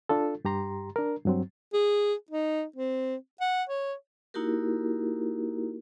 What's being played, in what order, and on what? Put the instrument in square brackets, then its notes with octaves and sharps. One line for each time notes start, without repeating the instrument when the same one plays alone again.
[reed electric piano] D4 F4 A4
G2 G4 A#5 C6
D4 A#4
G2 F#3 C4
[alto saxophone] G#4
D#4
C4
F#5
C#5
[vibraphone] A#3 D#4 E4 F#4 G4 A#4